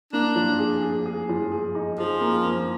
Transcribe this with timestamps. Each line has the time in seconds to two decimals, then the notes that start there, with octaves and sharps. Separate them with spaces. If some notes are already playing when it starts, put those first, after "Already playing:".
0.13 A#3 D4
0.36 F3
0.59 G#4
0.82 G#4
1.06 G#4
1.29 F3
1.52 G#4
1.75 D#4
1.98 F3 G#4
2.21 A#3
2.45 A#3